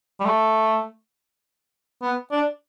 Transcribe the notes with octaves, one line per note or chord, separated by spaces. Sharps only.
G3
A3
B3
D4